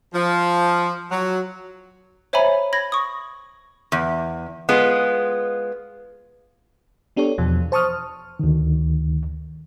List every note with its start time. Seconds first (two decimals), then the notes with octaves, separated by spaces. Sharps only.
0.14 F3
1.11 F#3
2.33 C5 C#5 E5 G#5 A#5 B5
2.73 B5 G#6 A#6
2.92 C#6 D#6
3.92 E2
4.69 G#3 B3 F4
7.16 B3 D4 G4 A4 C#5
7.38 E2 B2 F3
7.72 C5 A5 C#6 D#6 F6
8.39 D2 D#3